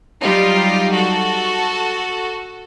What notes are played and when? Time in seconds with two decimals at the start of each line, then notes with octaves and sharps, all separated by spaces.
0.20 F#3 G3 D#4 F4 G4
0.94 F#4 A4